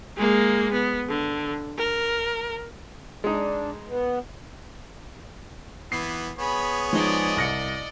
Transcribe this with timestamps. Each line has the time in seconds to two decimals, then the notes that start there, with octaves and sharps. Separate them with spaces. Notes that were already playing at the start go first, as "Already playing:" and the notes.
0.16 G#3 A#3
0.73 B3
1.08 D3
1.78 A#4
3.24 G#3 D4 D#4
3.88 B3
5.92 E3 B3 C7
6.39 B3 G#4 C#5 B5
6.93 F3 G#3 D#4 D5 D#5
7.36 C2 A#6 C#7